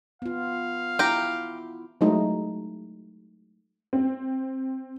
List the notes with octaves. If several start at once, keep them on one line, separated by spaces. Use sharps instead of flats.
B3 F4 F5
E4 G4 A#5
F#3 G#3 A3 D#4 E4
C4